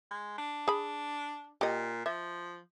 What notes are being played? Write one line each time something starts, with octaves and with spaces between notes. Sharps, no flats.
G#3
D4
G#4 B5
A#2 G4 D#5
F3 E5